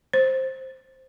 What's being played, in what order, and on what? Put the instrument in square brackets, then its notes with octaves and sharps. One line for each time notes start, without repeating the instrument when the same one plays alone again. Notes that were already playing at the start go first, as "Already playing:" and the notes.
[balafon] C5